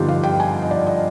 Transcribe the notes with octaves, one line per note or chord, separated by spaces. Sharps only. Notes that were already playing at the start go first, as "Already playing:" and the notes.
Already playing: G2 D3 F3 B3 D#4 F4 G4
F5
G5
G#5
D#5
D5
D#5